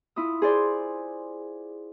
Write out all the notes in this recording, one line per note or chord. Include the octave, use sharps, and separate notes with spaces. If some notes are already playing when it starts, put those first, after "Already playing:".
E4 F4 D#6
G#4 C5 D5